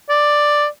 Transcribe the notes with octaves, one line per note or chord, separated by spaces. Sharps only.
D5